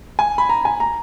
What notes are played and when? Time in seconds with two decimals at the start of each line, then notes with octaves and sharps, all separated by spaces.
0.19 G#5
0.38 B5
0.49 A#5
0.65 G#5
0.80 A#5